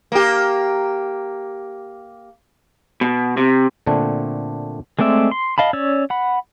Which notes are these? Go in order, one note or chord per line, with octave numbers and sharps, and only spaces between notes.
A#3 G4
B2
C3
A#2 D3 A3 C4 D4
G#3 A3 C4 D5 E5
C6
D#5 F5 A5 B5
C#4 C#5 D5 E6
F#5 B5